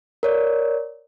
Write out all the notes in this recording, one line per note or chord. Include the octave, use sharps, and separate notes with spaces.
A#4 C#5 D5